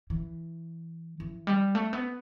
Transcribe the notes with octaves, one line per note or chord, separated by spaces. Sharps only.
E3
E3
G3
A3
B3